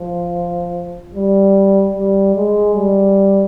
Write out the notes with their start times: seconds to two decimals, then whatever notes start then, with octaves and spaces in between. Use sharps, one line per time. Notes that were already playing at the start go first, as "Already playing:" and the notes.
Already playing: F3
1.14 G3
1.94 G3
2.35 G#3
2.75 G3